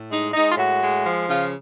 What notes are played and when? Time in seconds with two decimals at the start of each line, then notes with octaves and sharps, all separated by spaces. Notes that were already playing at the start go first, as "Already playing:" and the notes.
Already playing: A2
0.11 G#3 D#4
0.34 G#3 D#4
0.52 F4
0.57 A2 F#4
0.80 G#3
1.04 F3
1.27 C#3 F4